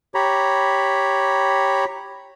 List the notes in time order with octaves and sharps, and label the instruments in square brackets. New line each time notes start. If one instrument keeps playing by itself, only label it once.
[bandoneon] G4 C#5 A#5 B5